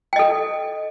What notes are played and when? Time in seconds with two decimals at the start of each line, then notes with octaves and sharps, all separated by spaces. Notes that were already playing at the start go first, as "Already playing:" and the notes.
0.13 G5
0.16 D#5
0.19 A4